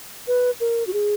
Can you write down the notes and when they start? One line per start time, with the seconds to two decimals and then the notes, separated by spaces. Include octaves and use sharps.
0.28 B4
0.60 A#4
0.87 F#4
0.93 G#4